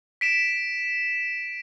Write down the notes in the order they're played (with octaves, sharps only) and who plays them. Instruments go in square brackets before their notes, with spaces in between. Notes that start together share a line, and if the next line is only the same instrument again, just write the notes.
[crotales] B6 D7 E7